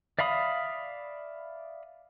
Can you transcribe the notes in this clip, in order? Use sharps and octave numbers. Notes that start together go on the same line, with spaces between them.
D5 E5 F5 B5 D#6